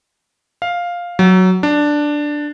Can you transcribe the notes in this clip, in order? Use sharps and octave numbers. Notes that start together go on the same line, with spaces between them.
F5
F#3
D4